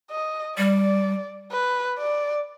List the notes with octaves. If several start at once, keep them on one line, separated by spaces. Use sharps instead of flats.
D#5
G3 D5
B4
D5